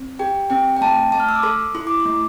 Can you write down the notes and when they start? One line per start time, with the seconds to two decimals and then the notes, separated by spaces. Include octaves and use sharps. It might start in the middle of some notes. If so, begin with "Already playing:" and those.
Already playing: C4
0.19 G4 G5
0.50 C4 G5
0.77 G5
0.81 A3 A5
1.12 A3 A5
1.20 F6
1.29 E6
1.35 D6
1.43 A4 C6
1.75 E4 C6
1.87 D6
2.00 C6
2.05 A3